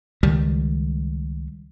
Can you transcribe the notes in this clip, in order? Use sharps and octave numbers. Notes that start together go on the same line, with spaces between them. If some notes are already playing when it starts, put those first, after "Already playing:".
C#2 D#3 G3